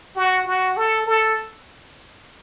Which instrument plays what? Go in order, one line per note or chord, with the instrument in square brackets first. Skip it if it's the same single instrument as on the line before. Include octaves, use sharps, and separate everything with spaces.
[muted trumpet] F#4
F#4
A4
A4